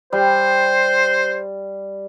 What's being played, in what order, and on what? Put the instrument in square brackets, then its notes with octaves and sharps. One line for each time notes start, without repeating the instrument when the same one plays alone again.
[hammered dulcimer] G3 [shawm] C5